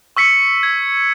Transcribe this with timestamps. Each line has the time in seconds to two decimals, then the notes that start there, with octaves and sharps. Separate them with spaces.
0.17 C#6 E6 B6 C#7
0.63 G#6